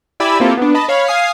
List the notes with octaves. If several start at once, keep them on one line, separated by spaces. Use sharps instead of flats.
E4 G4 D5 G#5 B5 E6
A#3 C4 E4 F4 G4 A4
B3 D4
D#5 A5 B5
C#5 F5 B5
F5 G#5 D#6 C7